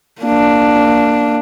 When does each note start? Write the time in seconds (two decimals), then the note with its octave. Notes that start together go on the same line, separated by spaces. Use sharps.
0.21 A#3 D4